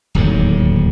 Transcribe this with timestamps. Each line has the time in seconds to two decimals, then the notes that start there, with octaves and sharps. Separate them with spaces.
0.15 D1 D#2 G#2 D3